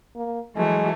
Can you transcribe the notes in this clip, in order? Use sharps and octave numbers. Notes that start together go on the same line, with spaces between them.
A#3
E3 F#3 G#3 A3